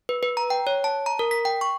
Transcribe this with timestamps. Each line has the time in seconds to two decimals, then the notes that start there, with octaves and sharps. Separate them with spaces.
0.09 B4
0.23 B4
0.37 A#5
0.50 G5
0.67 C#5
0.84 A5
1.06 A#5
1.19 A#4
1.31 B6
1.45 G5
1.61 C#6